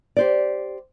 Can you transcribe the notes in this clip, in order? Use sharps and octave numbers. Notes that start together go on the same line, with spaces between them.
G4 C5 D5